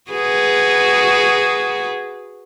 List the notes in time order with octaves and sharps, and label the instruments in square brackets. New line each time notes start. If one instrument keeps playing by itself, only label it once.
[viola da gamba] F#4 G#4 B4